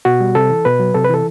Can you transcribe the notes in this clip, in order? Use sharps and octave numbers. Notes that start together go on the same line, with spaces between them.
B2 F#4
G3
C3 A4
E3
B2 B4
F#3
C3 A4
B4
E3 A4